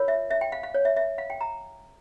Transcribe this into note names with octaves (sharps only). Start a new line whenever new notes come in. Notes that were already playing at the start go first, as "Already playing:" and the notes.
Already playing: F4 A#4 C#5
E5
E5
G5
F5
F5
C#5
E5
E5
F5
G5
A#5